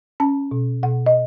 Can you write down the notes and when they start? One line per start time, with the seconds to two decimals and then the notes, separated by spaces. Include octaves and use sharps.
0.20 C#4 A5
0.51 B2
0.83 B2 F#5
1.06 D#5